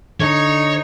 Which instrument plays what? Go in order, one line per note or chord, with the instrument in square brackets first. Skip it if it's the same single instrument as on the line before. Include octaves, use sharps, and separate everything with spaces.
[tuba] D3 [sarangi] D#4 [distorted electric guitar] C#5